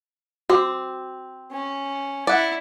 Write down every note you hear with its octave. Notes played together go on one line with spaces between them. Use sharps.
C4 F#4 D6
C#4
E4 D5 F#5